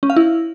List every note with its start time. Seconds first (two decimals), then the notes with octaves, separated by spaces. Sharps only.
0.03 C#4
0.10 F5
0.16 E4